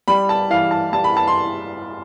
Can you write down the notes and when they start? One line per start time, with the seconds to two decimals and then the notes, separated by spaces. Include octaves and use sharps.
0.08 G3 B5
0.29 A5
0.50 E3 F5
0.71 A5
0.93 G3 A5
1.04 B5
1.17 A5
1.28 C6